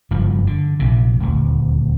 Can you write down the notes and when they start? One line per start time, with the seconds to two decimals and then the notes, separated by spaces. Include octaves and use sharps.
0.11 F#1 G2 C#3 F3
0.47 D3
0.79 A#1 C3
1.20 D#1 D2